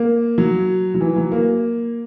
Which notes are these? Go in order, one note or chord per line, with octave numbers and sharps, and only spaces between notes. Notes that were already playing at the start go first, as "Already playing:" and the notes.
Already playing: A#3
F#3
F#3
E3
F#3
A#3